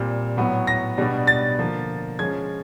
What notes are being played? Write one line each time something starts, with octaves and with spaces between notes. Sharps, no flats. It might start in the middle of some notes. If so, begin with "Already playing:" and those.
Already playing: A#2 G3 C4
A2 F#3 B3
A#6
B2 G3 B3 D4
A6
D3 F3 A#3
F3 G#3 C#4 G#6